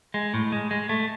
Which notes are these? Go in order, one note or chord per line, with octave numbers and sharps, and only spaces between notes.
G#3
A2
G#3
G#3
A3